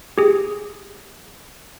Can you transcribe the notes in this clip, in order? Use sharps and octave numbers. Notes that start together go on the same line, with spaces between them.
G4 G#4